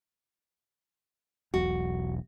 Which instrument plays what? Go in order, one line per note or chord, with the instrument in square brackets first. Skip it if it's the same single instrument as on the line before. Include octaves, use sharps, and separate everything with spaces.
[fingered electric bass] E1 B1 [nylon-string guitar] F#4